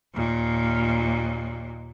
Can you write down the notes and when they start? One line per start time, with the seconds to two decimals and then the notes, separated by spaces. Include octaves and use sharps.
0.15 D#2 A#2